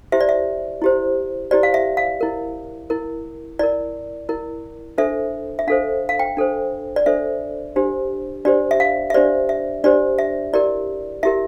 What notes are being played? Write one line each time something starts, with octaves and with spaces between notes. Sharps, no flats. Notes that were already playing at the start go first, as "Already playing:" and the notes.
E4 G4 C5 E5
D5
E5
E4 G4 C5
E4 G4 C5 D5
F5
E5
F5
E4 A#4
E4 A#4
E4 A#4 D5
E4 A#4
D4 A4 C5 E5
E5
D4 A4 C5 F5
F5
G5
D4 A4 C5
D5
D4 A4 C5 E5
D4 G4 C5
D4 G4 C5 D5
E5
F5
E5
D4 G4 C5 D5
E5
D4 G4 C5 D5
E5
E4 G4 A#4 D5
E4 G4 A#4 E5